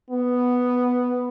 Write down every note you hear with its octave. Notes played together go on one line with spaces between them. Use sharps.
B3